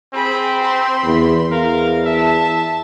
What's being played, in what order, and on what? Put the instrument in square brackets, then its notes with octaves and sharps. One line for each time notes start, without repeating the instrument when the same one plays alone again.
[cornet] C4 [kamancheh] G#4 B5
[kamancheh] B5 C6
[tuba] E2
[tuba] E2 [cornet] A#4 [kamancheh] F5
[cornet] E5 [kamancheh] A5